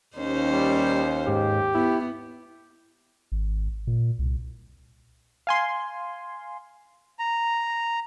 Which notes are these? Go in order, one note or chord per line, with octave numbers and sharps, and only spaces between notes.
D#2 C#4 D#4 C5
G3
G#2 G4
B3 E4
G#1
A#2
C2
F5 G#5 C6
A#5